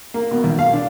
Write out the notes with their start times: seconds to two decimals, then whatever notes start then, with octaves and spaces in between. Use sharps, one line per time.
0.14 A#3
0.31 B2
0.44 B1
0.59 F5
0.73 D4